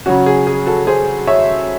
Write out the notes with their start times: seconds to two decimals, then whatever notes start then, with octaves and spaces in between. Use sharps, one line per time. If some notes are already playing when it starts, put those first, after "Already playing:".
0.06 C#3 F#3 C#4 F#4
0.26 G#4
0.47 G#4
0.66 F#4 A4
0.87 G#4 C5
1.27 C#5 E5